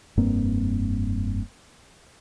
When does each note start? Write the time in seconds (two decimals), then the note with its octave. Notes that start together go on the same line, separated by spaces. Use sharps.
0.17 F1 G2 A#3 C4